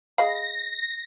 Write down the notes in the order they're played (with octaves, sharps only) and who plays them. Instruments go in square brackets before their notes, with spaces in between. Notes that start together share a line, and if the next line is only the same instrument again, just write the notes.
[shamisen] G#4 D#5 B5 [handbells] F5 [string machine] A#6